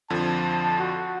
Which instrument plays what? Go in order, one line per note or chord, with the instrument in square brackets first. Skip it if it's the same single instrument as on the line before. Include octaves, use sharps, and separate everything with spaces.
[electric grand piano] F2 D3 F3 [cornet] A5
[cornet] F#4